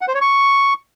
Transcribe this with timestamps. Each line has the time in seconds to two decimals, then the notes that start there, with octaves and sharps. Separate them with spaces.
0.01 F#5
0.08 C5
0.14 C#5
0.21 C#6